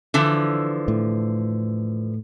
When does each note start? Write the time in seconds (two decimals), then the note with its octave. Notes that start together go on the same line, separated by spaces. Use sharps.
0.14 D3 E3 F3
0.88 A2